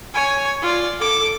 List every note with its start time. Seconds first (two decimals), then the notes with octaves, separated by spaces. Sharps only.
0.14 C#5 G#5
0.61 F4 D5
0.99 A4 D6